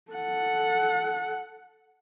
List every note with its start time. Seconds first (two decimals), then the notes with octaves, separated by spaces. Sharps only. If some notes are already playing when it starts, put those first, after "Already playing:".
0.12 A4 F#5